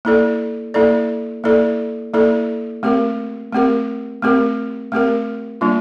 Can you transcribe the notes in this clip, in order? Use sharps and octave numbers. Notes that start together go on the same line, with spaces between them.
A#3 E4 A4 D5
A#3 E4 A4 D5
A#3 E4 A4 D5
A#3 E4 A4 D5
A3 C4 G4 A#4
A3 C4 G4 A#4
A3 C4 G4 A#4
A3 C4 G4 A#4
G3 A#3 D4 F4